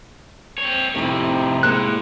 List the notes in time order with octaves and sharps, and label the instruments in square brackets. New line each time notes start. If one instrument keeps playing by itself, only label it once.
[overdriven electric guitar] C4 C#5
[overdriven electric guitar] F2 A2 [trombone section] C3 D#4 G4 [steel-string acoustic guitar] A3 E4
[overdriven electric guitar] A2 [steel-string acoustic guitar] G#3 A#3 C5 [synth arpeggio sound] F#6